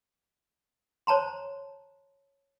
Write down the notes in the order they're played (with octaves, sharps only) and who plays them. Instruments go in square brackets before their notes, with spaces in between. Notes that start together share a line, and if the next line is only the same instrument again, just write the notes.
[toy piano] C5 C#5 A5 A#5 C6